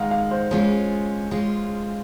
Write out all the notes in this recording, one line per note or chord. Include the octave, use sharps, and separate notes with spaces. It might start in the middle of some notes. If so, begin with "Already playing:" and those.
Already playing: D#3 G#3 D#4 F5 F#5
F5
C5
G#3 C#4 F4 C5
G#3 C#4 F4